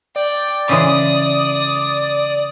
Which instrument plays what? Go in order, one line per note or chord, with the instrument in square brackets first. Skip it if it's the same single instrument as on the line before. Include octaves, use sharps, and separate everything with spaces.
[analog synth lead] D5 [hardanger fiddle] G5
[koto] C#3 E3 G#3 [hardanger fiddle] D#6